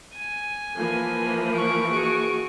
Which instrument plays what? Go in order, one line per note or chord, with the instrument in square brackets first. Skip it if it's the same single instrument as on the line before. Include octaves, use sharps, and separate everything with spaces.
[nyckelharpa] G#5
[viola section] E3 F3 A#3
[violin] C#6 D7
[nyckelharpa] F#4 G#4